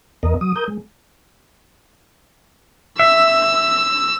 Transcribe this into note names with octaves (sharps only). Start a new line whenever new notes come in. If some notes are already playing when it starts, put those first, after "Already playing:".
E2 B3 A#4 D#5
F#3 D#6
A#4 D#6 G6
G#3
E5 E6